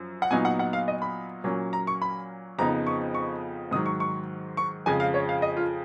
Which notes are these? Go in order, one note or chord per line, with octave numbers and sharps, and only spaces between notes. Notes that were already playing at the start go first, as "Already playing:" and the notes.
Already playing: F#2 F3
F#5
A#2 F#3 B3 D#4 G#5
F#5
F#5
F5
D#5
B5
A#2 F#3 A#3 C#4
A#5
C#6
B5
F2 C#3 F3 B3 D#4 A#5
C#6
C#6
G#2 D#3 F#3 D#6
C#6
C#6
C#6
F2 C#3 F3 G#3 G#5
F5
C#5
F5
D#5
F4